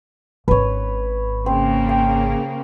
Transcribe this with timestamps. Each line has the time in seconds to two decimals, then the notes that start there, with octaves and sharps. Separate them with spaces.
0.48 G#1 C#4 B4 C#5
1.46 C#3 A#3 C4
1.89 G5